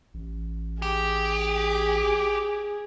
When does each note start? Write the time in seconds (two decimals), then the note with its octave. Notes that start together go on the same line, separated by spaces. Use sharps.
0.14 A1
0.82 G4 G#4